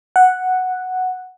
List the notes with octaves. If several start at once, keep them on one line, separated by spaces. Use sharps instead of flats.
F#5